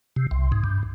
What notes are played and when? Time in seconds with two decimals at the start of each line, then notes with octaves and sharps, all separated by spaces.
0.16 C3
0.31 C2
0.52 G#2
0.64 G2